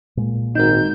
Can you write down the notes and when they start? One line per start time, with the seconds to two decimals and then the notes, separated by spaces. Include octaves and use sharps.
0.17 A#2 G#3
0.55 G#1 D#4 F#4 A#4 G6